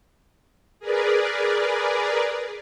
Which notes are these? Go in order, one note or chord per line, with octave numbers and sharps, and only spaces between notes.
G#4 A#4 B4 D5